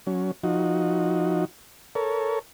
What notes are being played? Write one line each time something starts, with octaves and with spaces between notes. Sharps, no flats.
F#3 C#4
F3 D#4 F#4
A4 A#4 C#5